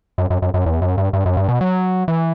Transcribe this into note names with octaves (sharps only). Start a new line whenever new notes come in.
F#2
F#2
F#2
F#2
E2
F#2
G2
G2
F#2
G2
B2
F#3
E3